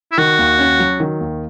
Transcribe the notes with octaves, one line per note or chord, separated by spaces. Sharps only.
E4
D#3 F#4
D#2
C#4
F#3
D#3
D#2